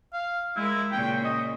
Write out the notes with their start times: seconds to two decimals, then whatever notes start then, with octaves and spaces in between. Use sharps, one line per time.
0.13 F5
0.56 G#3 E4 A#4
0.92 A#2 C#3 G5
1.24 D#5